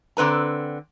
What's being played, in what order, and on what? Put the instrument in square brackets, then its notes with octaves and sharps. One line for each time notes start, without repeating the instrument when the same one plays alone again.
[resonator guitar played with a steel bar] D3 C4 B4 A#5